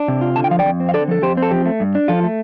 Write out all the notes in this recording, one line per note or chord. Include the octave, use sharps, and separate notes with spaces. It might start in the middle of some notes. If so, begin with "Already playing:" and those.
Already playing: D4
C3
F4
D3 A5
G5
F3 F5
D5 G5
F2
C4
F5
D3 A4 D5
F3 A4
F2 G4 C5
C4
A4
F3 G4
A3
G2
D4
F3 F4 A4
A3